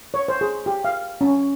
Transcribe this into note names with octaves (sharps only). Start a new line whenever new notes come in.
C#5
C5
G#4
G4
F5
C#4